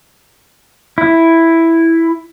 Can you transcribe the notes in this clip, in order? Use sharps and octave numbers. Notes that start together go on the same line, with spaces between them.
E4